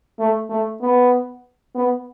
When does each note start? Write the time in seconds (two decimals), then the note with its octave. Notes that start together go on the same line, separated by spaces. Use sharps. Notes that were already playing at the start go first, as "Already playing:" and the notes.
0.19 A3
0.49 A3
0.81 B3
1.75 B3